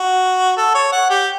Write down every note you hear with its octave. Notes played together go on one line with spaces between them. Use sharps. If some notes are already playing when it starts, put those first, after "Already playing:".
Already playing: F#4
A4
C#5
F#5
G4